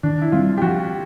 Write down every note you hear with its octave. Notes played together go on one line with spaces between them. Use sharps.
D#3 D4
E4
G3 C4 F4
G4
F3 F#4